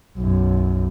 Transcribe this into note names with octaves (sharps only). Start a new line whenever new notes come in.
B1 F#2